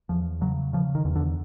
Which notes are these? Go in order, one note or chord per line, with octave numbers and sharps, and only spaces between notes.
E2 F3
C#3 F#3
C#3 F3
D#3
E2
D3